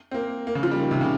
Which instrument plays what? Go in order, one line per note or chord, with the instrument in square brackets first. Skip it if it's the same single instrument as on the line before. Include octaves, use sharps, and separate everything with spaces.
[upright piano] C4
A#3
A#3
C#3
F3
G3
D#3
C3
C#3